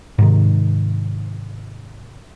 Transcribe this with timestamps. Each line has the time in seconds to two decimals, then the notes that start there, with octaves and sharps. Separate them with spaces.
0.18 G#2 C3 D#3